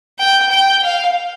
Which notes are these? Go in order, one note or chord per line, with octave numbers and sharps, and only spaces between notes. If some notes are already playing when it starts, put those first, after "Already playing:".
G5
G5
F5